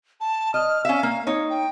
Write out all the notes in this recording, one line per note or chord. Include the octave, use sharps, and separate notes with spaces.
A5
D#5 F6
C#4 E5 F5
A#3
D#4 C#5
G5